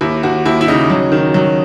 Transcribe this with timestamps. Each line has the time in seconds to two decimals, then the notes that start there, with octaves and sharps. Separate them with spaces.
0.01 D#2 E4
0.23 D#2 F#4
0.46 D#2 E4
0.61 E4
0.68 C#3 D#4
0.90 F#3
1.12 D#3
1.34 F#3